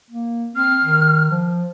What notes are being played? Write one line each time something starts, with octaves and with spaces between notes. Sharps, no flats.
A#3
C4 F6
D#3
F3